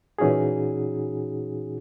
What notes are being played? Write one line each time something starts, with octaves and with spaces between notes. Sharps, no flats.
A#2 E3 C#4 D#4 F#4 G#4